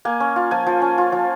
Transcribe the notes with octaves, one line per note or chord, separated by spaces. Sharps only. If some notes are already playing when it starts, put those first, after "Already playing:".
A#3 G#5
C#4
F4
F3 G#5
F3
C#4
F4
F3